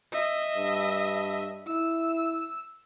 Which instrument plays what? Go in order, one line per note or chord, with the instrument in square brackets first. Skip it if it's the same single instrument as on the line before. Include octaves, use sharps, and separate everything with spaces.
[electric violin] D#5 E5
[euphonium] G2
[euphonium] E4 [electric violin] E6